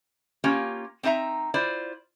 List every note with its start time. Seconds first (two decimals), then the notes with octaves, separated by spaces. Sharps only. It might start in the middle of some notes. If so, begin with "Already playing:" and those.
0.44 A#3 C#4 F4 G4
1.03 C4 D4 D#4 E5 A#5
1.54 E4 F4 C5 D5